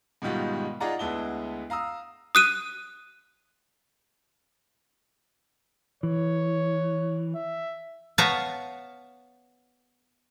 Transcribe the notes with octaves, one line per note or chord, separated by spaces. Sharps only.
G#2 B2 D#3 G3 F4 F#4
D#4 F4 G#4 D5 F#5 A#5
D2 G#3 B3 E4 A5 G7
F5 A#5 D#6 E6
D#6 F#6 D#7
E3 C#5
E5
B3 C#5 F5 A5 A#5